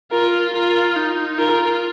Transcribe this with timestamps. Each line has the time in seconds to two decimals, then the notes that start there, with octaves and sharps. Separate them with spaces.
0.11 F4 A#4
0.53 F4 A#4
0.96 D#4
1.38 F4 A#4